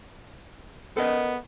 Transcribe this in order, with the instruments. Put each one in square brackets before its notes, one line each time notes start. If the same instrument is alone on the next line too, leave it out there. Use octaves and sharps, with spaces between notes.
[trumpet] B3 [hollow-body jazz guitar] A4 A#4 D#5